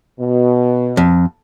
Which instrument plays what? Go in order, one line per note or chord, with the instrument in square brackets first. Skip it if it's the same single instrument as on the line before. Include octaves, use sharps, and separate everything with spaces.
[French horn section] B2
[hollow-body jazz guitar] F2